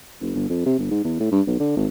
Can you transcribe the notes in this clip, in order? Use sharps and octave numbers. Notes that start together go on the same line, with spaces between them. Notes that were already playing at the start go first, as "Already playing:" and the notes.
F#1
G1
F2
C3
G1
G#2
E2
A2
G2
B1
D3
G#1